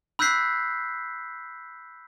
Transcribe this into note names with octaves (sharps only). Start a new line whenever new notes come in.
B5 E6 F#6 G6 B6 C7